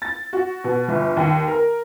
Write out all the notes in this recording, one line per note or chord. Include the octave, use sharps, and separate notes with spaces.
A6
F#4
B2
G1
D#2
A#4